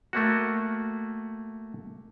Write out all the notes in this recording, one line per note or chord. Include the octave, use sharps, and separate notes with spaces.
A3 A#3 F#4